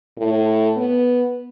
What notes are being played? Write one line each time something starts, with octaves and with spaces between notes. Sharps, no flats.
A2
B3